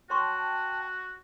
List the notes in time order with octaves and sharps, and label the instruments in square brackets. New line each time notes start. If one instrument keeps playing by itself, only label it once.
[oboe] F#4 [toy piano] C#5 C6 C#6 [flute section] G5 A5